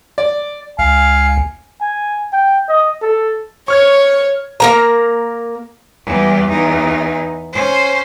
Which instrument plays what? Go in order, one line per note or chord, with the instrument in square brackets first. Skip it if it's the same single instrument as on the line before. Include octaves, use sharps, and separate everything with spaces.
[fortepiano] D5
[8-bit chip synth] C#2 [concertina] F5 [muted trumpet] G#5
[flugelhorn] G#5
G5
D#5
A4
[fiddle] C#5 [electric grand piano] C#6 F6 G#6
[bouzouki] A#3 A#4 A#5
[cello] E2 G3
E2 D#4
C#4 C5